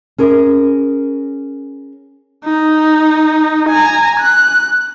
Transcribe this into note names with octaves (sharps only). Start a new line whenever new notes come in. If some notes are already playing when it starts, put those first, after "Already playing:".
C#4 G#4 A#4
D#4
G#5 A#5
F#6